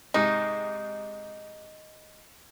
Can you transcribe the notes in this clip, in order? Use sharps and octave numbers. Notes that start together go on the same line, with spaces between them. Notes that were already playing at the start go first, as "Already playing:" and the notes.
G#2 C3 D#4 D#5